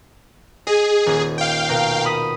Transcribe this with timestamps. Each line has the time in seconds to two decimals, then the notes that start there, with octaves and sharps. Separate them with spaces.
0.67 G#4 D#5
1.06 D#1
1.38 F5 G5
1.69 B2 A#4
2.05 B5 D#6 B6